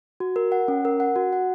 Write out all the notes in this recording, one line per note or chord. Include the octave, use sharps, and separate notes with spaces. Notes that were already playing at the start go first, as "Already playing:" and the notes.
F#4
A#4
F#5
C#4
A#4
F#5
F#4
F#5